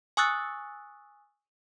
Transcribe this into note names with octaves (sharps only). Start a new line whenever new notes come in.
G#5 C#6 D#6 E6 F#6 A6